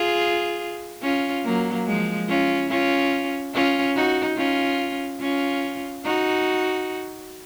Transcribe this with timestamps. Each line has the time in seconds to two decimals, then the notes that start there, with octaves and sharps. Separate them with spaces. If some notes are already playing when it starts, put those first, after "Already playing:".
Already playing: F4 G#4
1.02 C#4 F4
1.45 F#3 A#3
1.87 F3 G#3
2.28 C#4 F4
2.69 C#4 F4
3.54 C#4 F4
3.96 D#4 F#4
4.37 C#4 F4
5.21 C#4 F4
6.05 D#4 F#4